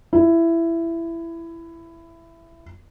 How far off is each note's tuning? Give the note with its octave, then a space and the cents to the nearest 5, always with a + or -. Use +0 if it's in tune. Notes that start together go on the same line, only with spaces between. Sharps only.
E4 +15